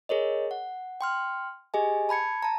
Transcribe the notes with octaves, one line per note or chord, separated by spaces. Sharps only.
G#4 A#4 C#5 D#5
F#5
G5 C6 F6
G4 G#4 D#5 G#5
A5 B5 G#6 C#7
A5 A#5